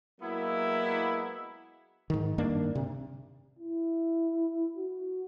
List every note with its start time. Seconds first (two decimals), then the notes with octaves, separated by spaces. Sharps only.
0.21 F#3 G#3 A#3 B3 E4
2.10 G#2 D#3
2.38 G2 D#3 A#3 D4
2.75 C3
3.59 E4
4.77 F#4